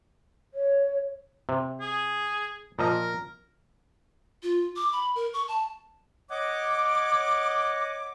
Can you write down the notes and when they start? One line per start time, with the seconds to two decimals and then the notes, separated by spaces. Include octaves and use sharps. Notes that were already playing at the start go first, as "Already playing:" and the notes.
0.54 C#5
1.49 C3
1.81 G#4
2.79 A#2 F3 A#4 D#5
4.43 F4
4.76 D6
4.92 B5
5.15 A#4
5.34 C#6
5.48 A5
6.30 C#5 D#5 F#5 D6